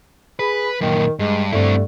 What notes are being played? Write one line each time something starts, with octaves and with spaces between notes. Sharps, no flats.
G#4 B4 B5
F#2 A#2 D#3
G2 G#3
G2 D3 A3 C4 E4